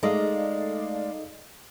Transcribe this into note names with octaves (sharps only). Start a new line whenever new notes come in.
G#3 A3 D#4 A4 D5 D#5 F5